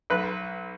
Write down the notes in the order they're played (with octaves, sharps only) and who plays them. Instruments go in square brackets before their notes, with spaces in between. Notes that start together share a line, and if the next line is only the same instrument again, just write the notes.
[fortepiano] B1 B4